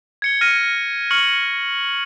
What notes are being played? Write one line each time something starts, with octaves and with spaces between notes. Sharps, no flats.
G#6 C#7 G7
F6 A#6 D#7
C#6 F6 C#7 F#7